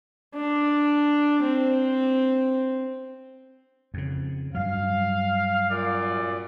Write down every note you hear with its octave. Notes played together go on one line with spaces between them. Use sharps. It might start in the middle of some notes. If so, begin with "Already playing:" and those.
D4
C4
F2 C#3
G2 F#3 F5
F#2 A#2 D5